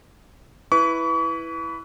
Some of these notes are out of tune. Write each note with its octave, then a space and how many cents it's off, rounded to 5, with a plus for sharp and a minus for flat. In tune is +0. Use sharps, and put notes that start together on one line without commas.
E4 +0 B4 +0 C#6 +40